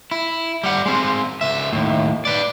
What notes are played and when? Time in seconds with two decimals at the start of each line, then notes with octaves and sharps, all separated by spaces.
0.11 E4
0.63 G3 F#5
0.86 G#3 C4
1.41 C#2 E5
1.73 D#2 A2
2.25 B4 D5